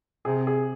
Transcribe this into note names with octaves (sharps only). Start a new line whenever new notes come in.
C3 G#4
G#4